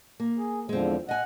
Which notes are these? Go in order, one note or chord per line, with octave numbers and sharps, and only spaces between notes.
A#3
G#4
E2 D3 F3 G#3 C4
D#5 F#5 G#5